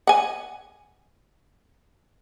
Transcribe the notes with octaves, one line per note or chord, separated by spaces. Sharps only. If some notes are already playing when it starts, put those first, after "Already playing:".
F#5 G#5